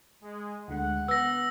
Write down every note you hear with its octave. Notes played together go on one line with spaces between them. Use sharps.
G#3
D2 D3 G#3 F#5
B3 E6 A#6